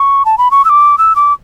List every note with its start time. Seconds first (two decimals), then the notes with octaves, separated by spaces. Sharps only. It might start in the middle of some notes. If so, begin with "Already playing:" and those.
Already playing: C#6
0.25 A5
0.38 B5
0.51 C#6
0.65 E6
0.69 D6
0.98 E6
1.16 D6